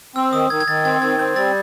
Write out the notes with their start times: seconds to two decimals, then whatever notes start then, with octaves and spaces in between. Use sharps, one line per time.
0.16 C4 E6
0.32 D#3 D#6
0.50 D#3 G#6
0.60 G#6
0.67 D#3 A6
0.85 C4 G#6
1.01 D#3 G#6
1.19 C4 G6
1.36 G3 A6